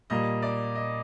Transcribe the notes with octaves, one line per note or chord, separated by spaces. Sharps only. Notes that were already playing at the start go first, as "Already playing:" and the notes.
A#2 G3 A#3 D#5
D5
D#5